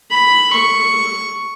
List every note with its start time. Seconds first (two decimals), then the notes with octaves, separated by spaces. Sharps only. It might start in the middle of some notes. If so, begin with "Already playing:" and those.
0.10 B5
0.53 C#6